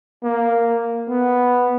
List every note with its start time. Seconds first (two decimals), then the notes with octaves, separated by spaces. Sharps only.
0.23 A#3
1.09 B3